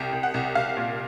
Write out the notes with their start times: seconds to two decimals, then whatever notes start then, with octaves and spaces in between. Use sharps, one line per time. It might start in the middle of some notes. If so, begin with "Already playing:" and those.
Already playing: C2 G5
0.13 C2
0.23 F#5
0.34 C2
0.55 C2 F5
0.77 A#2